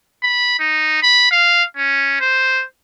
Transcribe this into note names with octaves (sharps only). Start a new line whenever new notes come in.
B5
D#4
B5
F5
C#4
C5